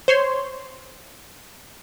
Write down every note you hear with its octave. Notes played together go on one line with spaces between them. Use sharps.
C5 C#5 C6